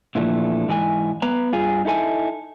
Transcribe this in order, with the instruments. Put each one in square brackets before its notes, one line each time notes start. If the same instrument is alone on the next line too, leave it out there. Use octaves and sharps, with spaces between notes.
[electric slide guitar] A#2 D3 E3 F3 A3
G#2 E3 G#4 G#5
B3 B4 A#5
G2 F4 G#4 G#5
D#4 E4 A4 A#4 G#5